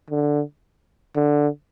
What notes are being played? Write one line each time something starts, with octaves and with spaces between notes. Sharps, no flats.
D3
D3